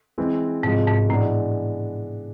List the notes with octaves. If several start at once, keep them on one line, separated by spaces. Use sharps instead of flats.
E3 G#3 C4
G#2 C3 F3 G#3
G#2
A2 E3 G#3 B3 D4